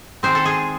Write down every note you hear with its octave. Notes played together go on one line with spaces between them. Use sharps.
D#3 G#3 C4 C5
A4
G#4